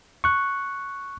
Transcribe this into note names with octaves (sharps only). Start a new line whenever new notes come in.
C#6 F#6